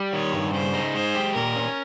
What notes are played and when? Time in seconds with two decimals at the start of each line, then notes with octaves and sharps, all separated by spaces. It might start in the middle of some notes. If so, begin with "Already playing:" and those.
Already playing: G3
0.13 D#3 C#5
0.33 G2
0.53 C#3 C5
0.74 D#4
0.95 G#3 C5
1.15 G4
1.35 A#2 A#4
1.56 C#4